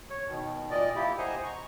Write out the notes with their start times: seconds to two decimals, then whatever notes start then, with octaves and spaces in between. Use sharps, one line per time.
0.10 C#5
0.28 B2 D#3
0.71 A#2 D5 D#5
0.96 A#3 E4 G4
1.18 C5 D#5 F#5 G#5 A#5
1.44 A#5 C#6